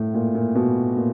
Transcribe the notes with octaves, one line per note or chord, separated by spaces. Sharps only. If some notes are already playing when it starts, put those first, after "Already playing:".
Already playing: A2
A#2
A#2
B2
A#2